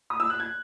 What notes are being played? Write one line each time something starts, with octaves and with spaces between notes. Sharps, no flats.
D#6
E6
F#6
G#6